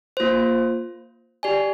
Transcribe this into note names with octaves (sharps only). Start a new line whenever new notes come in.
A#3 F4 C5
G4 D5 G#5